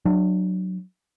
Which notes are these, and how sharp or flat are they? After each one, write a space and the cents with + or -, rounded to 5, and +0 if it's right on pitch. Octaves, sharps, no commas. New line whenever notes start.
F#3 +0 D4 +30